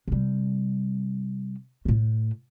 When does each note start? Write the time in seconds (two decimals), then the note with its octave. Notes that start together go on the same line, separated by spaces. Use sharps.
0.08 C3 G3
1.85 A2 A3